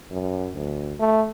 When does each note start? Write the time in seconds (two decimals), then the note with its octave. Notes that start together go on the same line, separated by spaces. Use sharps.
0.11 F#2
0.55 D2
0.99 A3